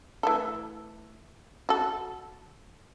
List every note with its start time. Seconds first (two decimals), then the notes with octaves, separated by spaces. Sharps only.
0.23 E3 A3 A4
1.69 F#4 A4